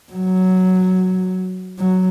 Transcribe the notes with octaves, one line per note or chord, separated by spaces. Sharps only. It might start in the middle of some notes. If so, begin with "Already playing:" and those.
F#3
F#3